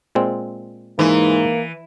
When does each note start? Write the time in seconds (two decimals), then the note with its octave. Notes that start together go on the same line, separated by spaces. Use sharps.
0.15 A#2 G#3 C4
0.99 G#2 E3 A#3